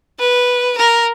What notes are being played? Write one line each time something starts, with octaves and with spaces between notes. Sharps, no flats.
B4
A#4